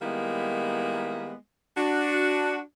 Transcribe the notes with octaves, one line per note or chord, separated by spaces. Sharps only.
D#3 G3 G#3 A#3 B3 E4
D4 F#4